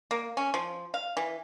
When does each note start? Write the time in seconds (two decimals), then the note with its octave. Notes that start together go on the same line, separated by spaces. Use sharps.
0.11 A#3
0.37 C#4
0.54 F3
0.94 F5
1.17 E3